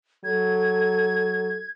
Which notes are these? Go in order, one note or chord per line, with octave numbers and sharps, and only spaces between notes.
F#3 A4 G#6